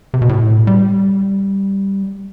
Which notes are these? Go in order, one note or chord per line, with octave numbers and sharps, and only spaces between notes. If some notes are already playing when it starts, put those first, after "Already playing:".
C3
B2
A2
G3